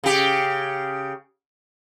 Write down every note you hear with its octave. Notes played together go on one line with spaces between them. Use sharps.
C#3 G4